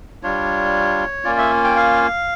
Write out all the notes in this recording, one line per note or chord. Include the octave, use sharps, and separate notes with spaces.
G3 D4 F4 C#5
A#3 C#4 F4 D5
E5
G5
F5